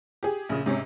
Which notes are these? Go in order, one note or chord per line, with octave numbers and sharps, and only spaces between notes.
G4 G#4
A#1 C#3
G#2 C3 C#4